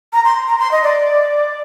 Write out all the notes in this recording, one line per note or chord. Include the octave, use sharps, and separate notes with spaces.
A#5
C6
A#5
C6
D#5
D5